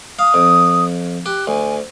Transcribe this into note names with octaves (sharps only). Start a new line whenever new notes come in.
F5 D#6
F2
G4 F#6
D2 G#5